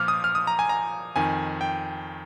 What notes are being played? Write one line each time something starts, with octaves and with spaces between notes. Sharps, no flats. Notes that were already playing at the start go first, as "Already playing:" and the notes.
Already playing: A#2 F3 D6 F6
D#6
F6
D#6
A#5
G#5
A#5
F2 D#3 G#5
G5